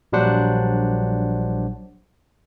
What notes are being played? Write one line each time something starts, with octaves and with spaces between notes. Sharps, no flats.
A#1 F#3 G3 D4 C5 F#5